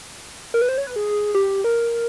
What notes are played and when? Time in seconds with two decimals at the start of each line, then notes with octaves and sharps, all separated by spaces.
0.54 A#4
0.62 B4
0.69 C5
0.78 C#5
0.87 B4
0.96 G#4
1.34 G4
1.64 A#4